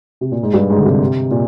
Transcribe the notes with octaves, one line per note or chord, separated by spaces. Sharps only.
C3
A#2
G#2
G2
G#2
D3
C3
A#2